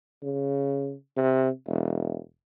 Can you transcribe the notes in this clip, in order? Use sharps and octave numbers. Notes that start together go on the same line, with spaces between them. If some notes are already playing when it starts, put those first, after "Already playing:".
C#3
C3
E1